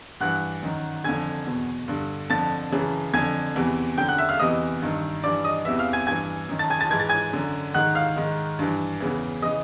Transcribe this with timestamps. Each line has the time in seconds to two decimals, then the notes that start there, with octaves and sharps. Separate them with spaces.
0.20 G2 E3 F#5 F#6
0.63 F#2 D#3
1.04 F2 D3 G#5 G#6
1.46 E2 B2
1.88 G2 D3
2.30 F2 D3 A5 A6
2.72 F#2 C#3 E3
3.13 F2 D3 G#5 G#6
3.56 E2 C3 E3
3.98 F#2 D3 G5 G6
4.08 F#5 F#6
4.18 E5 E6
4.29 F5 F6
4.39 E2 C3 E3 D#5 D#6
4.82 G2 D#3
5.23 G2 E3 D5 D6
5.44 D#5 D#6
5.65 E2 C3 E3 E5 E6
5.79 F5 F6
5.93 G#5 G#6
6.07 G2 E3 G#5 G#6
6.49 F#2 D#3
6.59 A5 A6
6.70 G#5 G#6
6.80 A5 A6
6.91 G#2 E3 G#6
7.00 A6
7.09 G#5 G#6
7.33 F#2 D3
7.74 G#2 D#3 F#5 F#6
7.95 F5 F6
8.16 G#2 D#3
8.59 G2 E3
9.00 E2 C#3 E3
9.42 C#3 E3 D#5 D#6